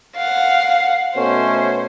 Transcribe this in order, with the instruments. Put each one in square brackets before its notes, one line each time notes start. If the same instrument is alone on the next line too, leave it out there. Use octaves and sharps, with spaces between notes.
[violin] F5 F#5
[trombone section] B2 A3 C#4 [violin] C5